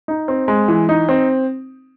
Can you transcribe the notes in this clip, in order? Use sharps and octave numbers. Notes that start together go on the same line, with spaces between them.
D#4
C4
G#3
E3
D#4
C4